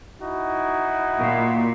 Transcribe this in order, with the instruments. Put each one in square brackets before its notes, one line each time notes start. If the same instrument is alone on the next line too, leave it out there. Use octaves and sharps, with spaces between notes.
[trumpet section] D#4 E4 F#4
[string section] A#2